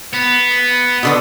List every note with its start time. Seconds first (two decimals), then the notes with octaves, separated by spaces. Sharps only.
0.14 B3
1.03 B2 D3 B3